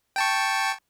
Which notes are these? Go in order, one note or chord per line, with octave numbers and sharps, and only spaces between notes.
G5 A5 C#6